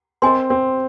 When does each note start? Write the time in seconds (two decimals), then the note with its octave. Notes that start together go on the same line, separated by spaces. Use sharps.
0.22 C4 A#4 D#5 G#5 C6
0.50 C4